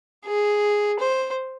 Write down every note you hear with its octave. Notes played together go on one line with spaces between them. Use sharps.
G#4
C5